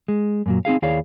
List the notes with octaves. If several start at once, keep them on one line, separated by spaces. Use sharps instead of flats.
G#3
F#2 A#2 F#3
C4 D#4 G#4 F5
D#2 E4 G#4 C#5 D5 F5